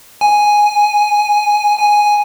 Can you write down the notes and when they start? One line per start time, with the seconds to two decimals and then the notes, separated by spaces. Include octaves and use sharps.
0.21 G#5
1.79 G#5